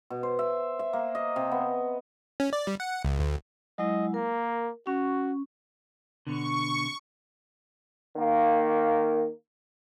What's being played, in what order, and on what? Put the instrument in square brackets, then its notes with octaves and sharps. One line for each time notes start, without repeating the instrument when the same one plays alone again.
[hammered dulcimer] B2
C5
E5
E5
A#3
D#5
C3
B3
[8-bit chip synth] C#4
D5
G3
F#5
C#2
D2
[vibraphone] F#3 G#3 E4 [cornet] D#5
[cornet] A#3 [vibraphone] A#4
[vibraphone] C#4 [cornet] F#4
[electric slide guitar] B2 D3 [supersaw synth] C#6
[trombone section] D#3 A#3